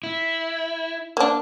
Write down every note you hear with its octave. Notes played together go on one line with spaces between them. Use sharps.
E4
A#3 D4